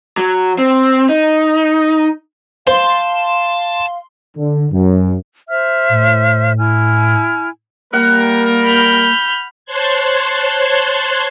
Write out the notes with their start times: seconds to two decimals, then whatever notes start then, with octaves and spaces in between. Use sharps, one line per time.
0.18 F#3
0.58 C4
1.09 D#4
2.67 C5 F5 A5 C6
4.37 D3
4.72 F#2
5.49 C5 E5 F6
5.89 A2
6.58 E4 G#5 F6
7.93 G3 A#3 A#4 F#5
8.64 B5 F6 G6
9.65 C5 C#5 A5 C6 F#6 G#6